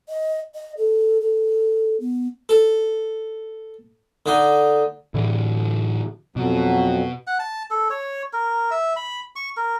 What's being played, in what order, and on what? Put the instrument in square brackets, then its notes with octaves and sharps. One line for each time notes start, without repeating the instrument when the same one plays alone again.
[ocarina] D#5
D#5
A4
A4
B3
[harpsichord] A4
D3 D#4
[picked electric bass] A2 D3 E3
[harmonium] F2 F#3 [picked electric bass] B2
[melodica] F#5
A5
A4
C#5
A#4
E5
B5
C#6
A#4